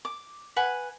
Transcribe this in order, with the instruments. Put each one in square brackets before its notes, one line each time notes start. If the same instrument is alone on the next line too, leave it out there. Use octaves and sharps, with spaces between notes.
[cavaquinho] D6
B4 F#5 G#5